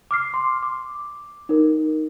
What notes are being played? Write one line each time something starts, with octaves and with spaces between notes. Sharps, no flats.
D6 F6 C7
C6
D6
D#4 A#4